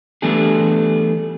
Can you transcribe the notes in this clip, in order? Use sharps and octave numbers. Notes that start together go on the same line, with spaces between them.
E3 G3 A3 B3 D4 G#4